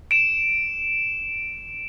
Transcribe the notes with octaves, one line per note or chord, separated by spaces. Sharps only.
D7 E7